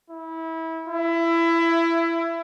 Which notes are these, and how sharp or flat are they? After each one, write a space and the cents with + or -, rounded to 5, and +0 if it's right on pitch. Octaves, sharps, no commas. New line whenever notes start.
E4 -25
E4 +20